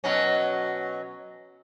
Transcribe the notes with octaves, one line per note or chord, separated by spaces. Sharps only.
B2 F#3 C#4